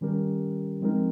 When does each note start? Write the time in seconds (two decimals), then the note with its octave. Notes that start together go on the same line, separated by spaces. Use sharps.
0.01 D#3 G3 C#4 G4 A#4
0.81 F3 G#3 C4 D#4 A#4